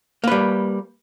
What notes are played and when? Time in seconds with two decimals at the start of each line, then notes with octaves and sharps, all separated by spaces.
0.24 A#3
0.28 B4
0.31 G3